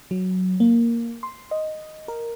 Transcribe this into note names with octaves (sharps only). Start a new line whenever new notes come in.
F#3
A#3
C6
D#5
A#4